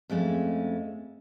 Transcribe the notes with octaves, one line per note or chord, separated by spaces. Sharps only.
F2 G#3 A3 C#4